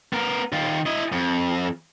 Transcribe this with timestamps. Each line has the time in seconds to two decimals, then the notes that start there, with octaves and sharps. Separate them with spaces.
0.13 B3 A#4
0.53 D#3 F4
0.86 E4 D#5
1.12 F2